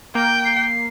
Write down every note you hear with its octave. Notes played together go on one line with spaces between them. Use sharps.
A#3 G5
C7